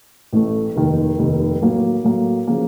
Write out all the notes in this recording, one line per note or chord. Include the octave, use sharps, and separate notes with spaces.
A1 A2 A3
F1 D#2 D#3
F1 D#2 D#3
A2 F#3 A#3
A2 F#3 A#3
C#3 F3 A#3